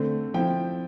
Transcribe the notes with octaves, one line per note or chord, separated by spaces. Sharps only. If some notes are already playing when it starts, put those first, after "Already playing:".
Already playing: D3 A3 C4
F3 C4 E4 G5